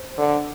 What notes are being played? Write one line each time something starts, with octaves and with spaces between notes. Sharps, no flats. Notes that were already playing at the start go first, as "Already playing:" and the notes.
Already playing: C5
D3